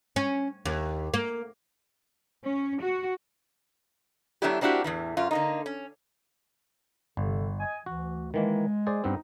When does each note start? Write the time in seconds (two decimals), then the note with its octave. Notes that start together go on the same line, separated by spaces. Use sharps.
0.16 C#4
0.65 D#2
1.14 A#3
2.44 C#4
2.81 F#4
4.42 F#3 A3 B3 D4 E4 G4
4.61 A#3 C4 D4 E4 F#4 G4
4.84 E2 A2 E3
5.17 F#2 F4
5.31 D3 A#3 D#4
5.66 C#4
7.17 G1 C3 A4
7.59 D#5 G#5
7.86 D2 E3 F#4
8.34 D#3 E3 G#3 A#3
8.87 G#4 C5 D5
9.04 G2 B3 C4 D#4